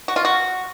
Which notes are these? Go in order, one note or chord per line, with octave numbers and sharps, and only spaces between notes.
F#4
F4
F#4